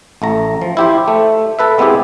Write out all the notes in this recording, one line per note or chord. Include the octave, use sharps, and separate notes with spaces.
A1 A3 A#5
F3
E4 G4 C5
A3
A4 B4 E5
G#3 B3 C4 E4 G4 G#4